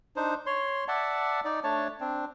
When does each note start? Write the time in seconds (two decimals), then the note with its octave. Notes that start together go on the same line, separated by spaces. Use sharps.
0.16 D4 D#4 C5
0.46 C#5 C6
0.88 D5 E5 F#5 A5
1.45 D#4 D5
1.63 A3 D4 C#5 A5
2.00 C4 D4